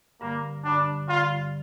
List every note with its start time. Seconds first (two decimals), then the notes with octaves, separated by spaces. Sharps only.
0.21 G2 D3 G3 A#3
0.64 G2 D3 G3 D4
1.09 G2 D3 G3 F4